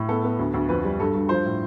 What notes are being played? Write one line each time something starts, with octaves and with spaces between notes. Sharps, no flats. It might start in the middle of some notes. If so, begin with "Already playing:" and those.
Already playing: A2
B3 A4
B3
D2
D2
F2 B4
G3
G2 A4
G2
F3 C5
A2